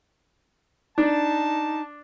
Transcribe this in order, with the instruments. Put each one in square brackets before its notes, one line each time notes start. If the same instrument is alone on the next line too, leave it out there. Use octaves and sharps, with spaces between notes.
[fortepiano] D4 [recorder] D#4 [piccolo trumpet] A5